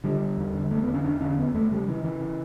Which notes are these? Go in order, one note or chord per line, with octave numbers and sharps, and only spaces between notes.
D3 G3
D3
E2
D3
E2 A3
B3
D3
C#4
E2 D4
D3 C#4
E2 B3
E2 A3
C#3 G3
C#3 E3
C#3 E3
C#3